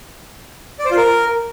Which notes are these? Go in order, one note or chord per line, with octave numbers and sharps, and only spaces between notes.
D5
C5
F4
A#4